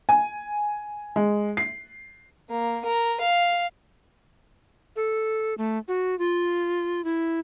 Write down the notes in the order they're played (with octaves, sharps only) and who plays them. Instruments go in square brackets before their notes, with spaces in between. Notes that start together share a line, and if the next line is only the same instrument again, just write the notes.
[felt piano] G#5
G#3
C7
[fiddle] A#3
A#4
F5
[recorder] A4
A3
F#4
F4
E4